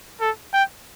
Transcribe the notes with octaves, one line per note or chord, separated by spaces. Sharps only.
A4
G5